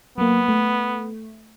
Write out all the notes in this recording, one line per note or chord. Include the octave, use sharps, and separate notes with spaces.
F#3 A#3 B3
A3